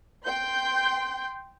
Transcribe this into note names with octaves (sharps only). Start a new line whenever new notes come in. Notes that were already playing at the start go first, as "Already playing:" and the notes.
G5 C6 G6